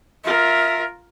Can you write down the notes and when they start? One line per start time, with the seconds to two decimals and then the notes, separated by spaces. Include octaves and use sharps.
0.24 F4 A#4 E5